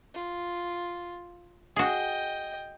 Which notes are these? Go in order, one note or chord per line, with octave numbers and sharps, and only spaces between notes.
F4
F#4 G#4 D#5 G5